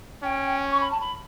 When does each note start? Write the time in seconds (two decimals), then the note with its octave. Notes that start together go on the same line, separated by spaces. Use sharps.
0.23 C#4 G5
0.70 C#6
0.80 B5
0.91 A5
1.00 B5